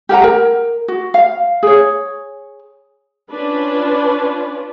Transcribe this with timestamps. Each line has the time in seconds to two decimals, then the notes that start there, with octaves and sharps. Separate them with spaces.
0.09 G4 A#4 F#5 A#5
0.24 A#4
0.88 F#4
1.14 F5
1.63 G#4 C#5
3.30 C#4 D4 F4 B4